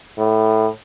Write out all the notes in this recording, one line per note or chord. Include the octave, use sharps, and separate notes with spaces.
A2